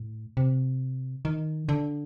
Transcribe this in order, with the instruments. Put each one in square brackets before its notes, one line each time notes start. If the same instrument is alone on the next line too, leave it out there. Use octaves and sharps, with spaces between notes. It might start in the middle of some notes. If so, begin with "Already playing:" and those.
Already playing: [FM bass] A2
C3
D#3
D3